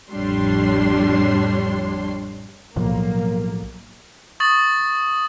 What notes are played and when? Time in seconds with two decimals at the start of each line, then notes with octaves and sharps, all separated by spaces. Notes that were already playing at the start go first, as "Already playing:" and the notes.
0.11 A1 F2 G3 D4 C#5 C6
2.76 B1 A2 F3 F#3 A#3
4.40 C#6 D#6 A6 F#7